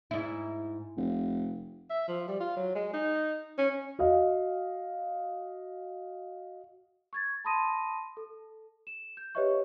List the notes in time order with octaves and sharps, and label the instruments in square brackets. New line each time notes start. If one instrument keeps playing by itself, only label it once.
[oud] G#2 E4
[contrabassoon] F1
[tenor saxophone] E5
F3
G3
F4
F#3
G#3
D#4
C#4
[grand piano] F#4 D#5 F5
[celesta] C#6 G#6 A6
A5 B5 C6 D#6 A#6 D#7
A4
E7
G6
G4 B4 C#5 D#5 E5 C#6